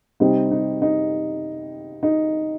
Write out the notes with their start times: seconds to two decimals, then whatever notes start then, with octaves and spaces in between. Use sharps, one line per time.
0.20 C3 G3 C4 D#4
0.51 D#4
0.82 D#4
2.03 D#4